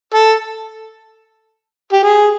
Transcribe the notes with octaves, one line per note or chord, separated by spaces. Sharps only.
A4
G4
G#4